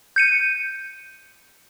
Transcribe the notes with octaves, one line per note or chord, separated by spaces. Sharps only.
G6 C#7 D#7